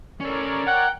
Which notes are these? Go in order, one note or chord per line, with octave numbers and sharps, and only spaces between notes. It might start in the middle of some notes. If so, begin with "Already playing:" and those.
C#4 A4 A#4 C#5 D5
F#5 G5